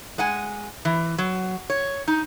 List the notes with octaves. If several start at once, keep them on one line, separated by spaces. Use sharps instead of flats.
G#3 F#5 G#5
E3
F#3
C#5
D#4